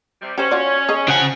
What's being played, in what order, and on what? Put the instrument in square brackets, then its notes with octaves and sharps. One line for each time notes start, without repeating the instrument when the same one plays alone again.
[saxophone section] C3 G3
[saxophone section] C#4 [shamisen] G4 C5
[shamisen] F4 F#4 D5
G#4 C#5 D#5
[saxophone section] F2 F3 F#5 [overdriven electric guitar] C#3 G#5 [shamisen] C5